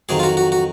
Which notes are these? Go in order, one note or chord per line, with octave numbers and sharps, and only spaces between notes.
F2 D#3 F#3 G#4
F4
F#4
F#4
F#4